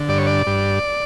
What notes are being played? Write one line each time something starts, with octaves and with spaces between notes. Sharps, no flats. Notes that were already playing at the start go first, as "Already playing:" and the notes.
Already playing: D3
G2 D5
C#5
D5
G2